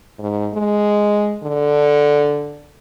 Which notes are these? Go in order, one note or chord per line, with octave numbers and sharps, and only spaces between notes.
G#2
G#3
D3